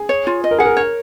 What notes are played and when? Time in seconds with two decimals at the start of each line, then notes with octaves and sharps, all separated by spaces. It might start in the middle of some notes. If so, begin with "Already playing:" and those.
Already playing: G#4
0.09 C#5
0.27 F4
0.44 D#5
0.51 A#4
0.59 G#4 F#5
0.66 A#4
0.77 C#5